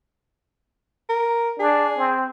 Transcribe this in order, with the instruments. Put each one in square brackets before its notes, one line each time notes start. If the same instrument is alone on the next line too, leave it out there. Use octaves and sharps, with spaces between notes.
[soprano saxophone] A#4
[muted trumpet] D4 [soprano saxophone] G#4
[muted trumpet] C4